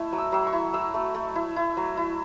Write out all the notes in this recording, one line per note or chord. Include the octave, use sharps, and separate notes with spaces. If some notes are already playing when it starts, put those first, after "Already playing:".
Already playing: A3 E4
F#3
E6
F#3 E6
C#6
E4
F#3 E6
A3
A3
E4
E4
F#3
E4